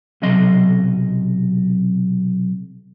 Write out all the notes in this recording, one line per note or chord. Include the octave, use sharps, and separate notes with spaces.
B1 C3 F#3 D#5 C6